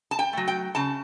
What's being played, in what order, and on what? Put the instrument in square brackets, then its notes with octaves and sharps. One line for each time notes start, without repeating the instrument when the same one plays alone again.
[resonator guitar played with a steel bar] A5
G5
F#3 A3
G5
C#3 A5